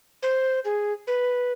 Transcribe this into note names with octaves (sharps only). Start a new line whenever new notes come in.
C5
G#4
B4